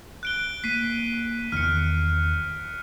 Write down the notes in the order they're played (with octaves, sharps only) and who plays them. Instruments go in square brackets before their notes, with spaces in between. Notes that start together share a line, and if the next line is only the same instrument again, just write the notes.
[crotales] F#6 D7 G7
[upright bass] A#3 [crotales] B6 C7 D#7
[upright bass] E2 D#3 [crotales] F6 C#7